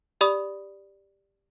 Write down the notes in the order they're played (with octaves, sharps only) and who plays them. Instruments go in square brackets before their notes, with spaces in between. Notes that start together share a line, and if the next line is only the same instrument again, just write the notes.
[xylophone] G4 D5 B5 D#6